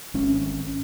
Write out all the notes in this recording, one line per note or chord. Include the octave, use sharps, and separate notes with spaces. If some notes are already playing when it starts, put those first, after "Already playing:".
G#1 C#4